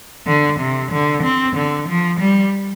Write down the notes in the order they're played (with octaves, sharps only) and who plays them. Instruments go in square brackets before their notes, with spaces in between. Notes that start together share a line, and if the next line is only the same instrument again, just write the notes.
[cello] D3
C3
D3
C4
D3
F3
G3